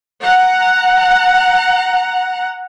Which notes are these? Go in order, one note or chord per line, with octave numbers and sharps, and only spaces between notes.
F#5 A#5